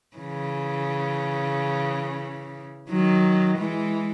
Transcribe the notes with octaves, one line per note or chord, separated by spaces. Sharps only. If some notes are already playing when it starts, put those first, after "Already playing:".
C#3 E3
D#3 F#3
E3 G#3